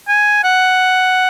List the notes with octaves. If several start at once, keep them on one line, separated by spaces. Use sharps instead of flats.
G#5
F#5